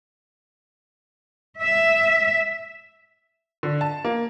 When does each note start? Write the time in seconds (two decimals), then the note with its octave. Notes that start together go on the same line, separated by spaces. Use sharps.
1.60 E5
3.63 D3
3.81 A5
4.05 A#3